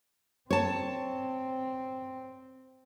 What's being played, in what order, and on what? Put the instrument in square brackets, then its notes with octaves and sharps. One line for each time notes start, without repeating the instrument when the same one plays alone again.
[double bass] C4 [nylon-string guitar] C#5 A5